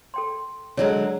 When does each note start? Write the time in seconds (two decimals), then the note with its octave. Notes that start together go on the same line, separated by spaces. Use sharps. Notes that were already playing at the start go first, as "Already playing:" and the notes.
0.14 A4 G5 C6
0.77 D3 F#3 G#3 C#5 A#5